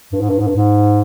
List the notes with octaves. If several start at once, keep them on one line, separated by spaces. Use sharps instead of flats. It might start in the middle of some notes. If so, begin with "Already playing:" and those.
G2
G#2
G2
G#2
G2
G#2